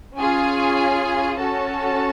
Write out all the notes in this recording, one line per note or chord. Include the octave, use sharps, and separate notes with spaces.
C#4 F4 G#4 G#5
C#4 F#4 A4 A5